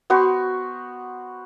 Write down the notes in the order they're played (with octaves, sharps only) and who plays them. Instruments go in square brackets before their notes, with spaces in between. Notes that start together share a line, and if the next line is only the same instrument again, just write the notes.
[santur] B3 F#4 C5 C#6